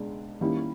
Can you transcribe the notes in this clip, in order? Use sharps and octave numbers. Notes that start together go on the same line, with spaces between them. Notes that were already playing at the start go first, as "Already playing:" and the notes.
Already playing: C#2 B2 G#3 D4
D#3 G3 A#3 C#4 E4